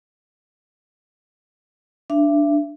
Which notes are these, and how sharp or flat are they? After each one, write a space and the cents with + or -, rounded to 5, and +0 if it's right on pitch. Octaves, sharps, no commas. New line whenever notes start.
D4 +0 E5 +30